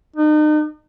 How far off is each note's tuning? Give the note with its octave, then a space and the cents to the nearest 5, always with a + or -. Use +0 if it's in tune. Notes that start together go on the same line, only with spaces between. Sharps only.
D#4 -40